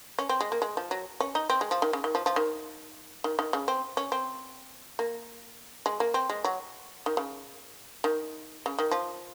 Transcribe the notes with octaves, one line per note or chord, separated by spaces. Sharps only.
C#4
C4
G#3
A#3
G#3
F3
F#3
C#4
D#4
C4
G#3
F3
D#3
C#3
D#3
F3
F3
D#3
D#3
D#3
C#3
C4
C#4
C4
A#3
G#3
A#3
C4
G#3
F#3
D#3
C#3
D#3
C#3
D#3
F3